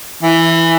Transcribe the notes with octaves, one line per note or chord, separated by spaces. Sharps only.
E3